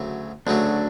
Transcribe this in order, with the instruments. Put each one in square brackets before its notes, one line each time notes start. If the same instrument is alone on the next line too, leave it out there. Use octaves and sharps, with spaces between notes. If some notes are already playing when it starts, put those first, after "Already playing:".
Already playing: [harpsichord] D2 C#3 F#3 A3
[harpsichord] D2 C#3 F#3 A3 [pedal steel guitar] D4